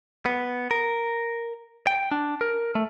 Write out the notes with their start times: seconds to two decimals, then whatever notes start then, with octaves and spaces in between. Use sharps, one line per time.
0.26 B3
0.71 A#4
1.87 G5
2.11 D4
2.41 A#4
2.75 A3